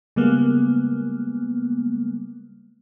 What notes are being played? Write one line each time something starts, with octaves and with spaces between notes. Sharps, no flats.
C#3 G3 G#3 A#3 B3